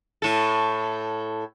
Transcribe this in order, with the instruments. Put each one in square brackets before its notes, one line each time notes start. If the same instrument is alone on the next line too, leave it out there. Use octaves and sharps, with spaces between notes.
[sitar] A2 A4